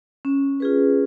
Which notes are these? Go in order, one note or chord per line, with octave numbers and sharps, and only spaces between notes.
C#4
F4 G#4 B4